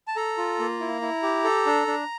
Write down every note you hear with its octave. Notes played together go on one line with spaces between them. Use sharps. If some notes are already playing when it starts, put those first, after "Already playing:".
A5
A4 A#5
F4
A#3
E4
E4
G4
A4
D4
D4